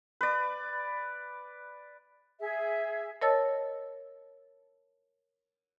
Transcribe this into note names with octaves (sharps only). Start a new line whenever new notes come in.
B4 D5
G#4 E5
A#4 C#5 D#5 A5 E6 A6